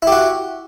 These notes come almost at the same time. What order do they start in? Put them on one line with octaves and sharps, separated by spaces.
E4 G4 F#4